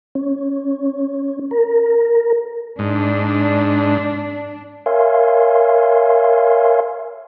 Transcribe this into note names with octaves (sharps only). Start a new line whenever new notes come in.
C#4
A#4
G#2 D4
A#4 C#5 E5 F5 G#5 C6